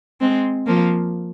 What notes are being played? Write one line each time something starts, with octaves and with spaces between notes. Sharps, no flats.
G#3 C4
F3 A#3